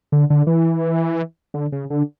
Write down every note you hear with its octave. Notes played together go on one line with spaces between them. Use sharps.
D3
D3
E3
D3
C#3
D3